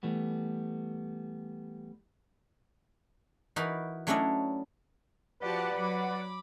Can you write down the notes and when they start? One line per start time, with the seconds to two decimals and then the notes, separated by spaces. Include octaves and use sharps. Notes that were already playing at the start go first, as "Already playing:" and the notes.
0.03 E3 G3 A3 B3
3.56 E3 D#4 F#4 A#4 B4
4.07 F#3 A3 C#4 D4 E4 D#5
5.42 F3 F#4 G4 B4 D5 F#5 A5
5.75 F#3 B5 D6